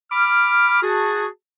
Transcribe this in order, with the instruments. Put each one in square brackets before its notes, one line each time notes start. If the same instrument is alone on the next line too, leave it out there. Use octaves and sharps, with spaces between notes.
[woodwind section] B5 D6 F6
F#4 G#4 A5